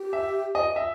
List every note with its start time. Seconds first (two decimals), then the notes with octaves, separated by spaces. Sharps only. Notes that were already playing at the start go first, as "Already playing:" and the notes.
Already playing: G4
0.13 E5
0.55 D#5
0.76 E5